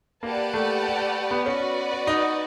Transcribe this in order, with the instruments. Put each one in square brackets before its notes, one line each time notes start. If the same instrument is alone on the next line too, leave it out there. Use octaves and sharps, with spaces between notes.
[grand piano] A#3 [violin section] G4 B4 D5 F#5 A5
[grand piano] A3
B3
[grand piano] C#4 [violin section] F#4 B4 D5 F#5
[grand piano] D#4